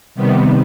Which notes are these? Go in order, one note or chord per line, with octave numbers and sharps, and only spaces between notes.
C3 D#3 G3 B3